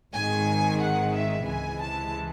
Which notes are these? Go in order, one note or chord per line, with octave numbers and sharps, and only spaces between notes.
G#1 G#2 D#3 G#3 G#5
F#5
E5
C#2 C3 E3 G#3 G#5
A5